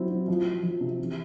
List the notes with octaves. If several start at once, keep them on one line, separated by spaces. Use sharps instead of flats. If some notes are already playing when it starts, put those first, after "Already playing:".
Already playing: F#3 C4 E4
F#3
F3
F3
F3
C3
E3